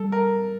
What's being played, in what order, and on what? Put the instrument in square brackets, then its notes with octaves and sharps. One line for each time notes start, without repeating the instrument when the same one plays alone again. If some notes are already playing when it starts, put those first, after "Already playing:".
Already playing: [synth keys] G3 [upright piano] A4
[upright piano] A#4